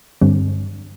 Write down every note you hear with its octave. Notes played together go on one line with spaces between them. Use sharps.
G2 D3 G3 C4